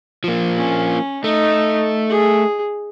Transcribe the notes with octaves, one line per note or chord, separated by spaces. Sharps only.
F3 A#3
C#4
A3 D#4
G#4